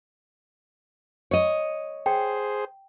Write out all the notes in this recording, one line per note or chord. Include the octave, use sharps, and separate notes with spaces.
C#5 D#5
G#4 C5 G5